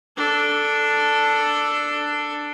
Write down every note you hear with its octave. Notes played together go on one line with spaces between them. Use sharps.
D4 A4